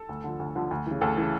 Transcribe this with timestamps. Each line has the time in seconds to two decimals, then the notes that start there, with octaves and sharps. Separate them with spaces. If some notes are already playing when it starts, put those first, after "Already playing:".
Already playing: A4
0.09 D2
0.24 D3 F3
0.39 D2
0.55 D3 F3
0.71 D2
0.86 C#3 E3
1.01 D2 A4
1.17 C#3 E3